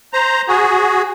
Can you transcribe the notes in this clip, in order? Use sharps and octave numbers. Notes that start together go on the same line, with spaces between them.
C5 A#5
F#4 G#4